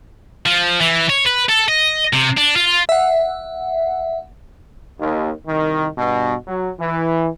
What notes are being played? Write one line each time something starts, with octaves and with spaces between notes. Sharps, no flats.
F3
E3
C#5
B4
A4
D#5
C3
D4
F4
E5 F#5
D#2
C2 D#3
G2 B2
F#3
E3